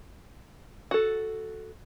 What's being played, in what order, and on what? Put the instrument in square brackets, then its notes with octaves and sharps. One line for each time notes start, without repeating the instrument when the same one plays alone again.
[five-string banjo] F#4 A4